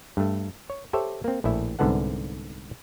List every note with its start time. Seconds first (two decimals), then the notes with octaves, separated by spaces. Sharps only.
0.17 G2 A3
0.70 C#5
0.93 G4 A4 C5 C#5 E5
1.24 A#3 C4
1.44 A#1 A2 E4 E5
1.79 C2 G#2 D3 B3 A4 F#5